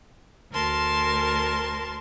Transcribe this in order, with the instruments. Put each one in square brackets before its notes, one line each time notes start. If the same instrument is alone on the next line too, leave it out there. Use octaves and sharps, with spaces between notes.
[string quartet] D2 A#4 A5 C6